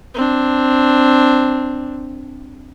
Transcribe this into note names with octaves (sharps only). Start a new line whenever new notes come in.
C4 D4